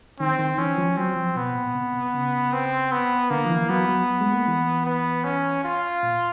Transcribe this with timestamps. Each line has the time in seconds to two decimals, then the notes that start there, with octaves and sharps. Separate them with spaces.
0.20 D#3 C4
0.39 D#3
0.58 E3 C#4
0.78 F3
0.97 F#3 C4
1.16 F3
1.36 B2 B3
1.55 A#2
1.75 C3
1.94 C3
2.14 C#3
2.53 C4
2.92 B3
3.30 D3 A#3
3.45 F3
3.49 E3
3.69 F#3 B3
3.89 F#3
4.21 G#3
4.33 A#3
4.48 E3
4.85 B3
5.24 C#4
5.64 F4
6.03 A#2